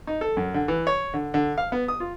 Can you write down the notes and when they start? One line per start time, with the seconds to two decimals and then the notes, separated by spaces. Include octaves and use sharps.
0.07 D#4
0.21 A4
0.37 F#2
0.54 D3
0.68 E3
0.87 C#5
1.14 D3
1.34 D3
1.58 F5
1.72 B3
1.88 D#6
2.00 F4